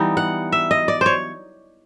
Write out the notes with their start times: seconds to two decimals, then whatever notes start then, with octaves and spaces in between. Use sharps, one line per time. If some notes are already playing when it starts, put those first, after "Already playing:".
Already playing: E3 G3 B3 D#4
0.17 F#5
0.52 E5
0.71 D#5
0.88 D5
1.01 C5 C#5